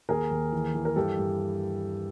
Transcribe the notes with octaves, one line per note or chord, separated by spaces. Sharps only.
D#2 G#4 A#4
D#2
E3
E3
A#4
G2 G4 A4
G2